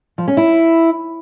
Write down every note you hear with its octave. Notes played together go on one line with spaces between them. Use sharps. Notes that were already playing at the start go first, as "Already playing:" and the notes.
F3
C#4
E4